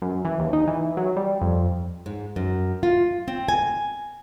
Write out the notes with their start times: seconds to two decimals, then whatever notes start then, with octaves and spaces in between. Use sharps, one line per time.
0.02 F#2
0.25 E3
0.39 D#2
0.53 D#4
0.67 E3
0.97 F#3
1.16 G3
1.41 F2
2.06 G#2
2.36 F#2
2.83 F4
3.28 C4
3.48 G#5